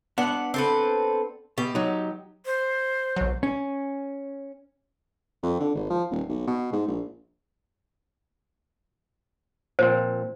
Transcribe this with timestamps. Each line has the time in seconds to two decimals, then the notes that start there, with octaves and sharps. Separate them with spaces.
0.18 B3 D4 F#5
0.54 C4 A4 B4
1.58 B2 G4
1.75 F#3 D#4
2.46 C5
3.16 B1 F#3
3.43 C#4
5.43 F2
5.60 D3
5.74 G#1
5.90 F3
6.11 D#1
6.29 B1
6.47 B2
6.72 G#2
6.88 A#1
9.79 A#2 F3 C4 C5